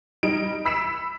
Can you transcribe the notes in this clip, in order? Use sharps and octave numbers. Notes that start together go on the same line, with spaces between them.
G3 D#4 D7
B5 E6 B6 C#7 E7